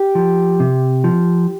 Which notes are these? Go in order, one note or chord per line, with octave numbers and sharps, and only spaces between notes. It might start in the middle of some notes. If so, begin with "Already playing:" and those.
Already playing: G4
F3
C3
F3